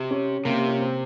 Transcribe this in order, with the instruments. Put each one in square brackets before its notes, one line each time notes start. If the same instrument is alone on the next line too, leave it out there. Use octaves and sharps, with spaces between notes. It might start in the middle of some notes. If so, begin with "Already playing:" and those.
Already playing: [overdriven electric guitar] C3
[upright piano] C#4
[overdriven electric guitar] C3 [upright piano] A#3
[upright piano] C#4
C4